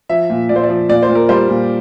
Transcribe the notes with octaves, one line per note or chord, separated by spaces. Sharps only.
F3 E5
A#2
A#2 D5
C5
D5
F3
A#2 D5
C5
A#2
A#4
G3 C5
A#2